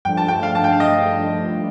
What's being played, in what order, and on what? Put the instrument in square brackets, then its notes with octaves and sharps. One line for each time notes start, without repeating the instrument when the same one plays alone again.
[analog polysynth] G2 F3 A3 D4 [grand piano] G5
[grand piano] A5
G5
F5
A5
G5
F5
D#5